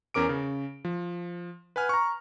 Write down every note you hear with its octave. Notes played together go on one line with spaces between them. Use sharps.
E2 C#4 A#4 D6 D7
C#3
F3
B4 F#5 G#5 F6
A#5 C#6